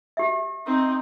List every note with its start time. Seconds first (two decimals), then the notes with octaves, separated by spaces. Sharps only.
0.17 G4 E5
0.66 C4 D#4